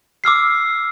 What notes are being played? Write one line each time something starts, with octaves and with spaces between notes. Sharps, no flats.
D6 E6 F6 C7